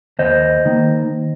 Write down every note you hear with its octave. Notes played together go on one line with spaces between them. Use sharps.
D#2 C5 D#5
D#3 A#3